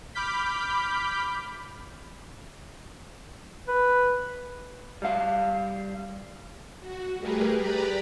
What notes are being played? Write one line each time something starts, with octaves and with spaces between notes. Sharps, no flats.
B5 D6 F6 G6 B6
B4
G3 F5
F#4
G3 A3 G4 G#4 A#4 B4
G4 B4 D5 A#5 B5